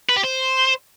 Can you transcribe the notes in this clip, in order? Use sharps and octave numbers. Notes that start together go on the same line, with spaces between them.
B4
G4
C5